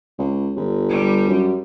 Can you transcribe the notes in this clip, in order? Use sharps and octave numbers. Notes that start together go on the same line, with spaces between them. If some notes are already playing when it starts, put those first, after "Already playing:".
C#2
G1
G3
F#2